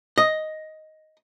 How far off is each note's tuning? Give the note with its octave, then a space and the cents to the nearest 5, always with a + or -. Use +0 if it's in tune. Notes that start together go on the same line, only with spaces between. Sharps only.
D#5 +5